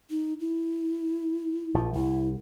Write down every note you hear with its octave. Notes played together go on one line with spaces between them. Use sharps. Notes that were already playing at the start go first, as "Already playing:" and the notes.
D#4
E4
A#1 F3
C2 E4